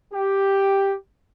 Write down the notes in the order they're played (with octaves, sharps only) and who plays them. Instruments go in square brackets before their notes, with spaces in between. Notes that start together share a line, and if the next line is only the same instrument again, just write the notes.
[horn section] G4